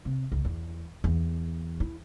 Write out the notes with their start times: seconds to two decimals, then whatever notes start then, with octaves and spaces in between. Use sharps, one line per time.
0.05 C3
0.32 C#2
0.45 E2
1.04 E2
1.80 E4